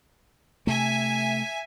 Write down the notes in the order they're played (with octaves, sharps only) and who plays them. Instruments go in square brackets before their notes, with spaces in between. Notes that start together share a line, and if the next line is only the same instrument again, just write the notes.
[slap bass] C3 A3 [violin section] E5 G#5